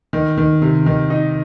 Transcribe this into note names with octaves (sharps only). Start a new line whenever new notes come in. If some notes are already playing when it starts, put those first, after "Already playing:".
D#3
D#3
C3
D#3
D#4